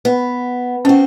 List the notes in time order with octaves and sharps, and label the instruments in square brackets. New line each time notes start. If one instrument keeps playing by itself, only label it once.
[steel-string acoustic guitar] B3
[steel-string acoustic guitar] C4 F#4 [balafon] C#4